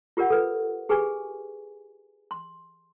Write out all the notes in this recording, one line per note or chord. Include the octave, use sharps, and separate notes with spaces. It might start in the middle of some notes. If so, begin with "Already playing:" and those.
F4 G4 A#4 D5 F#5
A4 B4
G4 G#4 B4 G#5 C#6
C6